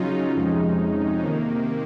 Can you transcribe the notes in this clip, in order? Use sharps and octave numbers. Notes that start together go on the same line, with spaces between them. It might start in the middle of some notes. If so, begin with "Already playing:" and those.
Already playing: C#3 F#3 C#4 D#4 F4
F2 C3 F3 G#3 C#4
C3 D#3 A#3